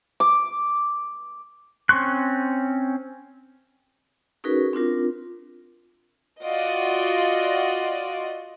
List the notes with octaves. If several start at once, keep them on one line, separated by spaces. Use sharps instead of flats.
D6
C4 C#4 C6 C#6 F#6
C#4 D#4 F#4 G#4 A#4 B4
C4 D4 F4 A#4
F4 F#4 D5 D#5